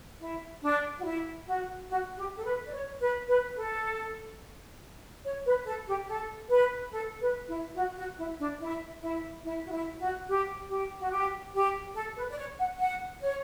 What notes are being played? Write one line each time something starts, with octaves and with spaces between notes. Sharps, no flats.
E4
D4
F#4
E4
F#4
F#4
G4
A4
B4
D5
C#5
B4
B4
A4
C#5
B4
A4
G4
A4
B4
A4
B4
E4
F#4
F#4
E4
D4
E4
E4
E4
F#4
E4
F#4
G4
G4
F#4
G4
G4
A4
B4
D5
C#5
F#5
F#5
C#5